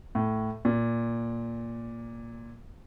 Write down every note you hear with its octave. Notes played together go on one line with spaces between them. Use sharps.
A2
A#2